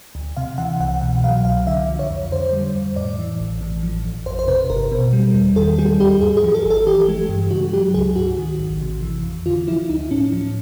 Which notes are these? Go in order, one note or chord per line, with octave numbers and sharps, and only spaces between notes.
D2
C3 F5
E3 F#5
C2 F#5
B2 F#5
F#3 F5
C2 F5
D3 E5
F3
C#5
F2
D3 C5
G3
F2
A2 D5
E3
A1
A2
F3
A1
F2 C5
C5
C3 B4
G1 A#4
B2
G3
E2
D#3 A4
G3 G#4
D#2 G4
G#2 G#4
G#4
F3
A4
G#1
A4
E3 G4
G#3
G2
C#3 F#4
F#3 G4
C#2 G#4
G#2 F#4
D#3
A1
C3
E3
F2
D3 F4
F3 E4
D2 D#4
A2 C#4
F3